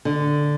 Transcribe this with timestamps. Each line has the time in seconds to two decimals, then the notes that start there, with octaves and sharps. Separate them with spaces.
0.05 D3